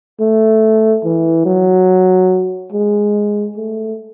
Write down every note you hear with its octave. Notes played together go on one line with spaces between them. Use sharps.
A3
E3
F#3
G#3
A3